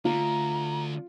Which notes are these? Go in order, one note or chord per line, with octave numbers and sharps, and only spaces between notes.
D3 A3 F4 A#5